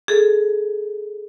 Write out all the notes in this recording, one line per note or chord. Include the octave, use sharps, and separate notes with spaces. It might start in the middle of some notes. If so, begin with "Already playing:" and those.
G#4 A4